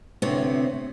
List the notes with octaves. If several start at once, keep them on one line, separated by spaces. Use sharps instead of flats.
D2 A2 C3 B3 C4 C#5